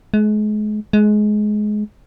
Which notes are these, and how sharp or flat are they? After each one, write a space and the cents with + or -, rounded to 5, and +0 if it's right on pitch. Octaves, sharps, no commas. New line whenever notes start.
G#3 +35
G#3 +20